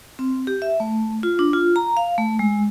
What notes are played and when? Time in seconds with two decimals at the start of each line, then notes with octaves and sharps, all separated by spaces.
0.19 C4
0.47 G4
0.62 E5
0.80 A3
1.23 F4
1.39 D4
1.53 F4
1.76 A#5
1.97 F5
2.18 A3
2.39 G#3